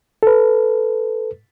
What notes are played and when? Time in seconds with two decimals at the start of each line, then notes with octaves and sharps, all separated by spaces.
0.23 A4 B4